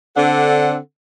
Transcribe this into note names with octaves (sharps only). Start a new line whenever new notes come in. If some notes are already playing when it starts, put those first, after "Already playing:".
D3 C4 D4 A4 F#5